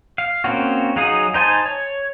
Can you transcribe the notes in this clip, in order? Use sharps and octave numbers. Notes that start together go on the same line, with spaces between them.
F5
A#3 C4 C#4 F#4
F#3 D#4 G#4 F5 D#6
D#4 C5 G#5 A5
C#5